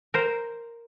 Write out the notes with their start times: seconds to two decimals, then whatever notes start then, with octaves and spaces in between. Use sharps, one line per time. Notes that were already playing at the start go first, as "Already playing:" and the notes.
0.14 A#4 C5